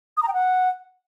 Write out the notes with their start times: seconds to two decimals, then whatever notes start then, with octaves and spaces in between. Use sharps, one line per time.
0.17 D#6
0.23 A#5
0.28 G5
0.34 F#5